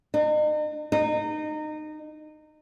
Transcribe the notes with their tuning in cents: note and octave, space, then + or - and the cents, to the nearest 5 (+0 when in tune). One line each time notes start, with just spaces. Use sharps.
D#4 -40
D#4 -25